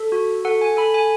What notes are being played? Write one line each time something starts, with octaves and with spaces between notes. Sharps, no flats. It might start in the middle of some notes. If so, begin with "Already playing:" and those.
Already playing: A4
F#4
A4 F#5
G#5
A4 B5
G#5